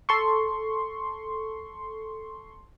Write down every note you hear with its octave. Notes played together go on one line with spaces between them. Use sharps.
A4 C6 C#6